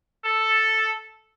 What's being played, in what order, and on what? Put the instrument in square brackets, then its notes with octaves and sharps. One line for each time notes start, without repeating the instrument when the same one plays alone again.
[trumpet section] A4